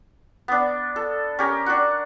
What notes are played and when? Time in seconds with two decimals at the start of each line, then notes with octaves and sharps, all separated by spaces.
0.48 B3 D4
0.96 A4
1.39 C#4 G4 A#4
1.66 D4 F#4 F#5